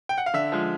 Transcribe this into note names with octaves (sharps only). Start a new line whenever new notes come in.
G5
F#5
F5
D3 E5
F3 G#3